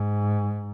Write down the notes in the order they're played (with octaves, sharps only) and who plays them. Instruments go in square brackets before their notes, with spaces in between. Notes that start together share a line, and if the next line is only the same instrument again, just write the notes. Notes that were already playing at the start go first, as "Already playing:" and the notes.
Already playing: [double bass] G#2